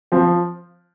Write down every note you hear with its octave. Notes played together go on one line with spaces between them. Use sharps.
F3 C4